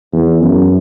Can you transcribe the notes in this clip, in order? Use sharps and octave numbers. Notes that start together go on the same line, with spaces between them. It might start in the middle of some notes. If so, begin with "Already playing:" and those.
E2
F#2